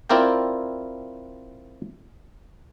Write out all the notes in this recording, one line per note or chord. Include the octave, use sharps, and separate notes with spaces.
C4 E4 F4 A#4 D5 G5